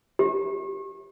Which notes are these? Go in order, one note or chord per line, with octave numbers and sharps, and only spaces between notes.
G4